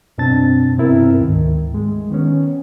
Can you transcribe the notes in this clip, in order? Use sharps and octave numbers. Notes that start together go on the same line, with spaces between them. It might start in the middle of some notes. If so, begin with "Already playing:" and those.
F#2 B2 C4 D4 A5 A6
G2 C3 B3 C4 E4 A#4
D2 G#2 D#3
G#3
D#3 B3 C#4